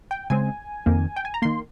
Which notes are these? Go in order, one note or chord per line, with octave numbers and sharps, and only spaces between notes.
G5
C#3 G#3 C4 G#5
F2 D#3 A#3
G5
G#5
A#5
D#3 A#3 C6